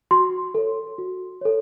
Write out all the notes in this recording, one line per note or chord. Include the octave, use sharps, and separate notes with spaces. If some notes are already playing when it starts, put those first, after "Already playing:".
F#4 C6
A4 C#5
F#4
A4 C#5